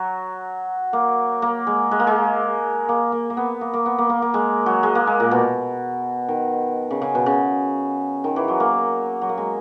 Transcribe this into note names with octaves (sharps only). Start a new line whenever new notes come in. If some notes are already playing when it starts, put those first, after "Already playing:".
Already playing: F#3
A#3
A#3
G#3
G#3
A#3
G#3
A#3
A#3
A#3
B3
A#3
A#3
B3
A#3
A#3
A#3
G#3
F#3
G#3
A#3
G#3
A#2
B2
D#3
C#3
C#3
B2
C#3
D#3
E3
F#3
A#3
F#3
A#3
G#3